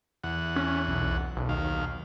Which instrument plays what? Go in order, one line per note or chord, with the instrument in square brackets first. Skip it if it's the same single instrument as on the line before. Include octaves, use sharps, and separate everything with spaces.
[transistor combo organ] E2 F#5
[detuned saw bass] C#4
B1
B1
[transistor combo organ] D#2 F5